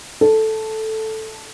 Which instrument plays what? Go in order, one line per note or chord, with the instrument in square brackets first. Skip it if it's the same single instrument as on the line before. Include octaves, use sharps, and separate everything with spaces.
[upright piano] A4